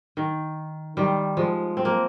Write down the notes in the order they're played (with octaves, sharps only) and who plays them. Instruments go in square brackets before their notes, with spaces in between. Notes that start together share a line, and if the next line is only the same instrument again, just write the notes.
[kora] D#3
D#3 G3
F3 G#3
C4
A#3